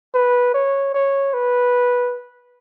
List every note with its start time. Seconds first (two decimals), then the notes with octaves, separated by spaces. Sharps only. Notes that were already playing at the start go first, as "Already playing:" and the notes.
0.14 B4
0.54 C#5
0.94 C#5
1.34 B4